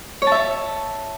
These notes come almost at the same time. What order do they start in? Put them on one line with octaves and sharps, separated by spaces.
C#5 A5 E5